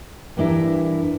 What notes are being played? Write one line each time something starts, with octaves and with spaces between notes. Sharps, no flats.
G2 E3 D4 E4 A#4